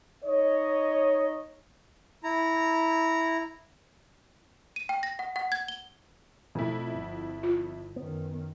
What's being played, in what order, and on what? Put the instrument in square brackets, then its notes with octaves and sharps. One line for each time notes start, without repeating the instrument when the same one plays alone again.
[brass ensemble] D#4 C#5 D#5
[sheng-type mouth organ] E4 A#5
[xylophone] D#7
G5
A#6
F#5
F#5
G#6
G7
[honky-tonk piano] F2 E4 [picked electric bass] B2 A3
[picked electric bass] G1
[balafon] F4
[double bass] F#2 D#3 [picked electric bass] B3